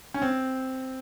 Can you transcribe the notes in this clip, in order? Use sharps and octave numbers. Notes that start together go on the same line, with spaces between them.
C#4
C4